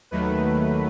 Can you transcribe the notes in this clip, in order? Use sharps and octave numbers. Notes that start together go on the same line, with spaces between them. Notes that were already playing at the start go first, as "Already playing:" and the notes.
D#2 D#3 F#3 A3 B4